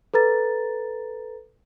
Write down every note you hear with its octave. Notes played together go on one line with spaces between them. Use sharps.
A4 B4 A#5 A6